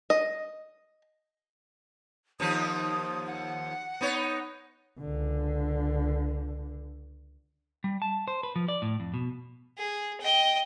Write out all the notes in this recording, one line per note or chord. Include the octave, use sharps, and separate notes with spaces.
D#5
D#2 F3 D#4 D#6
F#5
B3 D#4 C#5
C#2 D3
G3
A5
C5
B4
F3
D5
A2
F2
B2
G#4
D#5 G5